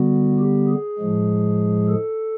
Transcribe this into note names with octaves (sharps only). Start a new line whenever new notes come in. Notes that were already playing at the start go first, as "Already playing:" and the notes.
Already playing: D3 G3 B3 F#4
G4
G#4
A2 F3 G#3
A4